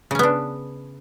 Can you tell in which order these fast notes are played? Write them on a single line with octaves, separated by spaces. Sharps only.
C#3 C#4 B3 D4